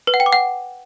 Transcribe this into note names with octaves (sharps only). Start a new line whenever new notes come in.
B4
F#5
G5
D6
F#5